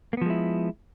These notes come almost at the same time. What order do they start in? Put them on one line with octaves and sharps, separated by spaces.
A#3 B3 F3 G#3 E4